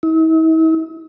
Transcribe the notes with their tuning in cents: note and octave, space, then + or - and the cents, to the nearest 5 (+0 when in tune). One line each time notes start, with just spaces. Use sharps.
E4 -45